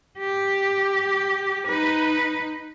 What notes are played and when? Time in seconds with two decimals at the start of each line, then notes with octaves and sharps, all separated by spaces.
0.19 G4
1.67 D#4 B4